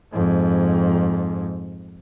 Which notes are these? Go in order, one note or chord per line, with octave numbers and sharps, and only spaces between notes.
F2 G#2